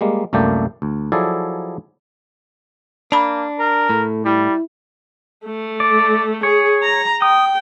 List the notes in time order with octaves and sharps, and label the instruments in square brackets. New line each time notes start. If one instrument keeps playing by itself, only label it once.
[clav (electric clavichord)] G3 G#3 A#3
C2 F#2 A3 A#3 D5 G5
D2
F3 F#3 E4 G#4 A4 D5
[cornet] A#3 [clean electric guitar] D4 [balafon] A5 B5
[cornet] A#4
[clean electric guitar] A2 [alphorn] A3
[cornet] G3 [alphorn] E4
[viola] A3
[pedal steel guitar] D5
[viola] G#4 [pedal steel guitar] C#5
[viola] A#5
[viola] G5 [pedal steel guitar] D#6